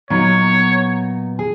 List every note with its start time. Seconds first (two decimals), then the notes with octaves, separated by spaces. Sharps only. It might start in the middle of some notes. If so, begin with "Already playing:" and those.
0.10 A#2 F#3 B3 D#4 C#5
1.39 G#4